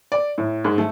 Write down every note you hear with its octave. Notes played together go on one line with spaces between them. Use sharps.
D5
A2
G#2
A3